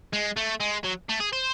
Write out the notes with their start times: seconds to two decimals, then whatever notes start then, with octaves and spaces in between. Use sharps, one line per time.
0.13 G#3
0.36 A3
0.60 G#3
0.85 F#3
1.09 A3
1.20 G#4
1.33 C5